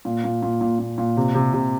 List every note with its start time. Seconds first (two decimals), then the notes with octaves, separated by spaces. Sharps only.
0.05 A#2
0.24 A#2
0.42 A#2
0.61 A#2
0.79 A#2
0.98 A#2
1.17 C3
1.35 C3
1.53 C3